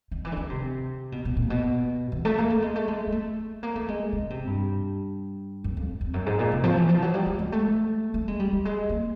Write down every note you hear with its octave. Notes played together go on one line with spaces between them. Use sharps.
D#3
E3
D3
D#3
C3
B2
B2
A#2
B2
E3
A3
A#3
A3
G#3
A3
G#3
A#3
A3
A#3
A3
G#3
C#3
C3
G2
F#2
F2
F2
F#2
G#2
A#2
C3
F3
E3
F3
F#3
G3
G#3
G#3
A3
A3
G#3
G3
G3
G#3
A#3